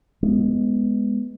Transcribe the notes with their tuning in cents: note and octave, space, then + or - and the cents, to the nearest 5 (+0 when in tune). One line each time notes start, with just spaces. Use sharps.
G#3 +0 B3 +0